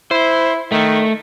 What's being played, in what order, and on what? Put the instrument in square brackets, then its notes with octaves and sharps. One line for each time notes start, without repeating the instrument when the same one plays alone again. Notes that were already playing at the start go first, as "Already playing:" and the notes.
[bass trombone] E4 [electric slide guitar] C5
[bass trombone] D#3 [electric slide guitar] A3